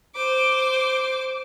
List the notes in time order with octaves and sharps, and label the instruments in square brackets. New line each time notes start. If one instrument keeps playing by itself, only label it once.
[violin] C5 D6